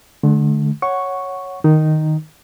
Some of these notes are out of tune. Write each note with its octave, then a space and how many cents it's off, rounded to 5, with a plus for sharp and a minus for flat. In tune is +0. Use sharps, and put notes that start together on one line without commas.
D3 +10 A3 -40
C#5 +0 F#5 +0 C#6 +0
D#3 -5 D#4 +0